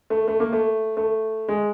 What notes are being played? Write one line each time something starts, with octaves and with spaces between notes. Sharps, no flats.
A3
A3
A#3
A3
A3
G#3